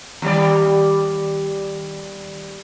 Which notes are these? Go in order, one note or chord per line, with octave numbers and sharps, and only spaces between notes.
D#2 G3 D5